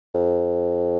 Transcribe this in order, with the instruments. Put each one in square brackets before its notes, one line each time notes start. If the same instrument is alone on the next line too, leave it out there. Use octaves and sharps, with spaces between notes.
[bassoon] F2